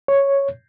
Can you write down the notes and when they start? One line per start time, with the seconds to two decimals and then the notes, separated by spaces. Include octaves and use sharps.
0.08 C#5